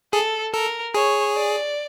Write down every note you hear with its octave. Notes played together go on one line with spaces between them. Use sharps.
G#4 A4
A4 A#4
G#4 C#5
D5